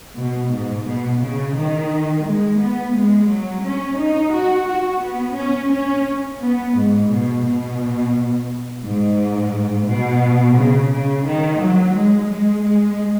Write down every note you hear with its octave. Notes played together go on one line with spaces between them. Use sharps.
B2
G#2
B2
C#3
D#3
G#3
B3
G#3
F#3
C#4
D#4
F#4
F#4
B3
C#4
C#4
B3
G#2
B2
B2
G#2
B2
C#3
C#3
D#3
F#3
G#3
G#3
G#3